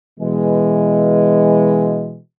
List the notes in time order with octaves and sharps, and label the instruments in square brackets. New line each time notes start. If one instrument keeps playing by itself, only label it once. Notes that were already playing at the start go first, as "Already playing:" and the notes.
[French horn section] B2 E3 G#3